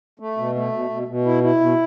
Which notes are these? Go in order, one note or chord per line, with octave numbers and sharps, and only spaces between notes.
A3
B2
A3
B2
B2
B2
E4
E4
B2